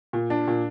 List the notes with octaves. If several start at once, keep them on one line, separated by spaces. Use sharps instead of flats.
A#2
D4
A#2